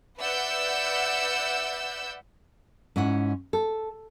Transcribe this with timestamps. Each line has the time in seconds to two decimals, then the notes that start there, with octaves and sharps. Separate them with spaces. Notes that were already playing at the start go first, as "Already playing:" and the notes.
0.19 B4 D5 E5 F#5 E6 G6
2.96 G#2 C#4 E4 F#5
3.53 A4